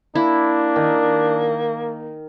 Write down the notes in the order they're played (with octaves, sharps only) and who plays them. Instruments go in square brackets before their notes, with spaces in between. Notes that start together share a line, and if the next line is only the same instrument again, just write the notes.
[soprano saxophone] A#3 [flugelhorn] D4 [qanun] E4
[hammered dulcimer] D#3